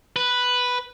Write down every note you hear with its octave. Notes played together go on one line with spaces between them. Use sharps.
B4